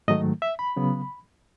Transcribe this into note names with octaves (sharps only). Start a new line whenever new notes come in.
G#2 D#3 F#3 A3 D#5
E5
B5
C#3 F#3 B3